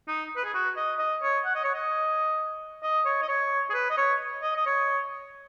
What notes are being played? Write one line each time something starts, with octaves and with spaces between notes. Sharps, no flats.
D#4
B4
G#4
F#4
D#5
D#5
C#5
F#5
D#5
C#5
D#5
D#5
C#5
D#5
C#5
G#4
B4
D#5
C#5
D#5
D#5
C#5